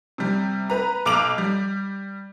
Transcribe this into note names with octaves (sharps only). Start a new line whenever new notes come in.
C3 G3
B4 A#5
B1 D6 D7 F7 F#7
G3